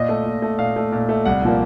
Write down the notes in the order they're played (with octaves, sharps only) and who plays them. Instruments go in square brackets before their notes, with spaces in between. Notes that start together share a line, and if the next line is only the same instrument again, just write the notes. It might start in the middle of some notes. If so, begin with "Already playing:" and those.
Already playing: [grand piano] A#2 D#5
A3
A#2
A3
A#2 F5
A3
A#2
A3
C2 F#5
A#2 F3 A#3